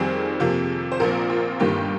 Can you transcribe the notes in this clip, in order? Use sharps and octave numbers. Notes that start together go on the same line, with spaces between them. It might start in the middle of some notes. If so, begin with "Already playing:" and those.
Already playing: F2 D#3 G3 C4 G#4
F2 C3 F3 A#3
C5
A#1 A#2 F3 C4 A#4
F4
G1 G2 D#3 A#3 G4